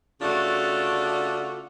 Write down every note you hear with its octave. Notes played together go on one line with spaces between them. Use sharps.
C#3 A3 D4 F4 F#4